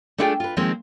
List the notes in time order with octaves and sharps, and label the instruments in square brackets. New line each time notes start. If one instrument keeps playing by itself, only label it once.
[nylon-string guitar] A3 D4 E4 F4 G#4 G5
F4 B4
D#3 F3 G#3 A#3 C4